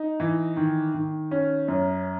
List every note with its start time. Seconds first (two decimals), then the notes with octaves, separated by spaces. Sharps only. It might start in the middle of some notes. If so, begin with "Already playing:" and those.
Already playing: D#4
0.20 E3
0.57 D#3
0.94 D#3
1.31 C#4
1.68 F#2